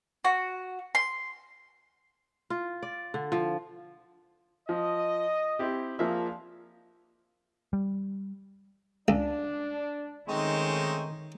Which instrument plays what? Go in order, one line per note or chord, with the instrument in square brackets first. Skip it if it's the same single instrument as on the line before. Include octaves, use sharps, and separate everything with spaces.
[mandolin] F#4
C6
[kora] F4
D5
D3
F3
[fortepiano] F3 [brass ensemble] D#5
[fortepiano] C4 E4 G4
[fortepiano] F3 A#3 E5 [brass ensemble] D4 G#4 F5
[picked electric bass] G3
[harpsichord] C#2 [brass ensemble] D4
[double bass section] D#3 [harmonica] G#3 C4 C#6 [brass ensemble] A3 C#4 D#4